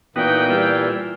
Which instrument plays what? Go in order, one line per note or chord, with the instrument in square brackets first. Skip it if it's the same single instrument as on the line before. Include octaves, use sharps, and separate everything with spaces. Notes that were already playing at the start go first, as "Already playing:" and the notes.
[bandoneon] A#2 E3 [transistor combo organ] B3 D#4 F#4 [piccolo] G5
[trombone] G3 [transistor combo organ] E4 F4